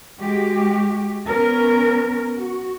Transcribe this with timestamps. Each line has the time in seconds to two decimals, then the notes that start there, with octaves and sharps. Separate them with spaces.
0.19 G#3 F#4 G4
1.28 B3 C#4 A#4
2.37 F#4